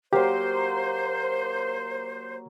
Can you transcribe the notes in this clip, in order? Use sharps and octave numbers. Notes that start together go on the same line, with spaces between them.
F#3 A#3 G4 C5